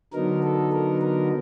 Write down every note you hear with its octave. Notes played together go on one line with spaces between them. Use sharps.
D3 F#3 B3 D#4 A#4
A4
A#4
A#4